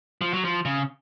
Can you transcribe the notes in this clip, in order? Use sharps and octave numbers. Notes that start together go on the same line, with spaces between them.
F3
F#3
F3
C#3